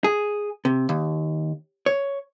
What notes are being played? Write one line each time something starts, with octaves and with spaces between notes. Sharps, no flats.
G#4
C3
D#2
C#5